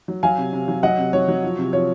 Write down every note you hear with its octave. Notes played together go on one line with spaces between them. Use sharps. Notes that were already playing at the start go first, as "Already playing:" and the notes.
F#3
F#3 F5 G#5
C3
C3
F#3
F#3 D#5 F#5
C3
F#3 C#5
F#3
F3
C3
F3 C#5